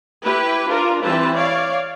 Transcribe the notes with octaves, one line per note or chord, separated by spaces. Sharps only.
E4 G4 B4
D4 F4 A#4
E3 G3 C4 B4 A5
C#5 D5 F5